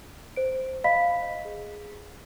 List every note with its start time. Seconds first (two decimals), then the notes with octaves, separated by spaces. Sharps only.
0.36 C5 D7
0.84 D#5 F5 B5 B6
1.45 G#4